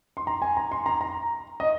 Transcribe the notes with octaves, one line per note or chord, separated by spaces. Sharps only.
C6
A#5
G#5
A#5
C6
A#5
A#5
D#5